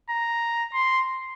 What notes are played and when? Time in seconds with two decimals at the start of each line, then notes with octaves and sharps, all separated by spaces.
0.10 A#5
0.74 C6